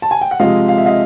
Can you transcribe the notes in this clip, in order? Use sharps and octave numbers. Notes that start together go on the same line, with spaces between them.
A5
G#5
G5
F#5
C3 F3 G#3 D#5 F5
F5
E5
D#5 F5